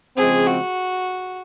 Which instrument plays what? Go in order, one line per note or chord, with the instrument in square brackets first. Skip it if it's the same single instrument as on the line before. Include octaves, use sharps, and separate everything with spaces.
[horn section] C#3 F3 G#3 C4 [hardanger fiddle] G#4
[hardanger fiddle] F#4